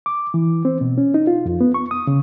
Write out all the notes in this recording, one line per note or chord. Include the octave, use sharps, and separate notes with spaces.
D6
E3
C4
B2
C#4
D#4
F4
F2
B3
C#6
D#6
C#3